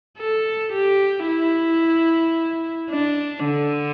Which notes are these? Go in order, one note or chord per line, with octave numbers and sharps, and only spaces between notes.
A4
G4
E4
D4
D3